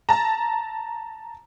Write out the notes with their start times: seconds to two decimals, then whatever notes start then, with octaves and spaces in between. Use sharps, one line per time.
0.09 A5 A#5